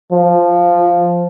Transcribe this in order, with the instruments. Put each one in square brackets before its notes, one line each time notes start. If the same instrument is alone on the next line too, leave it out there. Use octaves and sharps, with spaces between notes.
[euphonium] F3